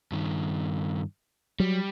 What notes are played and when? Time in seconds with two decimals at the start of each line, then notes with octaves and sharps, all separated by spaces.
0.12 G2 D#3
1.60 F#3 G3